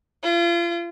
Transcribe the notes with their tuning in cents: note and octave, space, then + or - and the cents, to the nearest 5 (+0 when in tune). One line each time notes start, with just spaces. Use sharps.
F4 -35